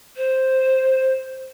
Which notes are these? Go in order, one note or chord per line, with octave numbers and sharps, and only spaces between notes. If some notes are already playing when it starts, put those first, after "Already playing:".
C5